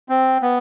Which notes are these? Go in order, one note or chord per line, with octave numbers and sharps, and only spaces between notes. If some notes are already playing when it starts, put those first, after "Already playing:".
C4
B3